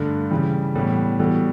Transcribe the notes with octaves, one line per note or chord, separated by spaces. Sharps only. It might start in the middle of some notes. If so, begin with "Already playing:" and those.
Already playing: G2 D3 A3
C#3 E3 G3
A2 E3 G3 B3
E3 G3 B3 F#4 A4